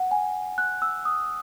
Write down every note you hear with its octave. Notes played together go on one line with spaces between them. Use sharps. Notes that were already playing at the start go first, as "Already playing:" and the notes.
Already playing: F#5
G#5
F#6
E6
D#6